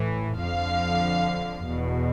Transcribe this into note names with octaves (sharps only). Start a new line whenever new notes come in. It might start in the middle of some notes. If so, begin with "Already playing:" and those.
Already playing: A2 E3
F2 D3 F3 F5
E2 B2